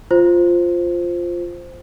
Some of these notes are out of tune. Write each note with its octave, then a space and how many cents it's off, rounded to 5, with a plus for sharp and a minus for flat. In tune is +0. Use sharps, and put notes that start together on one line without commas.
F4 +0 C5 +0